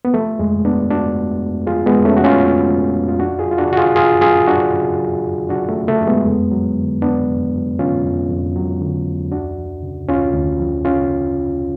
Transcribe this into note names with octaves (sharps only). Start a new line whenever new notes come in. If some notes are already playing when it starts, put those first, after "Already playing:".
B3
F3 A3
F2 G#3
F3 B3 D4
F2 D4 F#4
F3
F2
F3 F4 G#4
G#3 B3
F2
A3 C#4
F3 F#4
C#4 F4
F2
F3
F2
F4
F#2 D4 F#4
F4 G#4
F#3
F4
D4 F#4
C#3 F#4
F4 G#4
F#2 F4 G#4
F#2 F4 G#4
F#3 D4 F#4
C#3
F#2
F#2
F#3 D4 F#4
A3
C#3
A3
F#2
G#3 B3
F2
F#3
D3
F2 B3 D4
F2
F#3
D3 C#4 F4
F2
F2
F#3
D3
F2
D2 D4 F#4
F3
C#3
D2 C#4 F4
D2
F3
C#3 C#4 F4